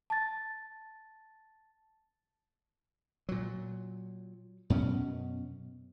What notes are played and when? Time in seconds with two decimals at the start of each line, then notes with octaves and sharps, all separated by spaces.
0.10 A5 A6
3.29 A#2 F#3
4.70 F#2 B2 B3 C#4